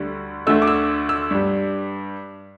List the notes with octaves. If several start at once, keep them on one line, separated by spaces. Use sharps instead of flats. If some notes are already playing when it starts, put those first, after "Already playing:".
Already playing: D2 D3 G3
D2 D3 A3 E6
D6
E6
E6
G2 G3